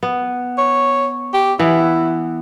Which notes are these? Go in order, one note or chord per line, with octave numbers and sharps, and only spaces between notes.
B3
C#5
G4
E3 B3 E4